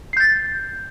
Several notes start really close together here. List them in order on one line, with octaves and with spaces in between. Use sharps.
C7 G6 A6